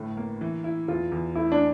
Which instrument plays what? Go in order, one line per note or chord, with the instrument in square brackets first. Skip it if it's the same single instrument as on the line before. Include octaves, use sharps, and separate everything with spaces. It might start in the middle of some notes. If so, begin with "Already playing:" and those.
Already playing: [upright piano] G1 A2
A#3
E3
E4
[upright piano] E2 [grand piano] F4
[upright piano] E2
[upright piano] A3 [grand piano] E4
[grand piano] D4